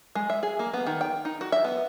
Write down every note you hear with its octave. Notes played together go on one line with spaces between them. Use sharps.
G#3
E5
G#4
A#3
B3
D#3
G5
D#4
F#4
E5
B3